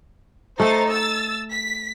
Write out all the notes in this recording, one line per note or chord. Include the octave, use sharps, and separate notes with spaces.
A3 D#4 A4 C5 A6
E6 A6
B6